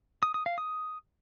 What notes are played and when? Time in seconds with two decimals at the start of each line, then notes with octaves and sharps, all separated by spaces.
0.23 D#6
0.34 D#6
0.46 F5
0.58 D#6